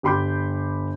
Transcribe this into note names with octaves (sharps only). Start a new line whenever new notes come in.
G1 G4 B5 C6 D6 G6